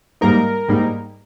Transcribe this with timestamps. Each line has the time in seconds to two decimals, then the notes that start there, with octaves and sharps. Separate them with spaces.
0.21 G#2 G3 A#3 D#4 A#4
0.68 G#2 G3 A#3 D#4